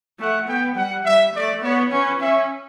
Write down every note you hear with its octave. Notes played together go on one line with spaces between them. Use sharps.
A3 F#5
B3 G5
G3 F#5
G3 E5
A3 D5
B3 C#5
C#4 B4
C#4 E5